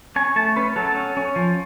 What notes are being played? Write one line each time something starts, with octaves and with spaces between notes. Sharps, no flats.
C#4 G#5
A3 A5
C#4 B4
F#3 A4
C#4
C#4
F3